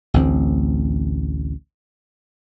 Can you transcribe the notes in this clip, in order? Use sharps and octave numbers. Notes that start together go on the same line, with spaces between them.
A1 D2 C4